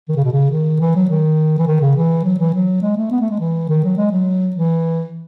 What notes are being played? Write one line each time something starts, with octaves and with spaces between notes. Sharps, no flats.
D#3
C#3
B2
C#3
D#3
E3
F#3
D#3
E3
D#3
C#3
E3
F#3
E3
F#3
G#3
A3
B3
A3
G#3
E3
D#3
F#3
G#3
F#3
E3